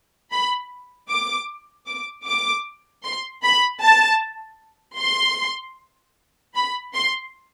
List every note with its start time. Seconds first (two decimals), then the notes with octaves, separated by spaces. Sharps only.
0.31 B5
1.09 D6
1.87 D6
2.26 D6
3.04 C6
3.44 B5
3.82 A5
4.99 C6
6.56 B5
6.94 C6